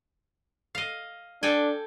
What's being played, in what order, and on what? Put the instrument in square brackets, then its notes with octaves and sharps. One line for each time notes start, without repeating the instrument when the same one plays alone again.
[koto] D#5 F5
[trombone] D4 [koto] A4 G5 G#5